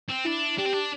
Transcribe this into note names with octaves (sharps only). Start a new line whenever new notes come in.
C4
D4 E4
D4 G4
C4
D4